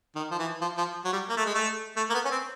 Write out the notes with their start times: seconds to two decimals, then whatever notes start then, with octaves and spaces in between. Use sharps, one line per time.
0.16 D#3
0.31 F3
0.39 E3
0.62 F3
0.78 F3
1.05 F#3
1.13 G3
1.30 A#3
1.37 A3
1.46 G#3
1.55 A3
1.97 A3
2.10 A#3
2.14 B3
2.25 C#4
2.31 C4